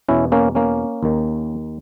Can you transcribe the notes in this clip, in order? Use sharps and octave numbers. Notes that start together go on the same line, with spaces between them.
E2 B2 C#4 E4
A#3 C#4
A#3 C#4
D#2 D#3